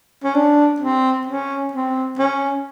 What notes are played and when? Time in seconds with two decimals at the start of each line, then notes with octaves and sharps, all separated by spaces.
0.24 C#4
0.34 D4
0.80 C4
1.27 C#4
1.73 C4
2.19 C#4